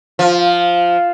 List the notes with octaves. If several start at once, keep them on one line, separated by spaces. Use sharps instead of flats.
F3